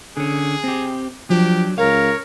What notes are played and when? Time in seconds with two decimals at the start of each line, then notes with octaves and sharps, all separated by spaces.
0.17 D3 C#4 G#4
0.64 C4 G4
1.30 F3 F#3 D4 G4
1.78 C#2 A#4 C#5 F5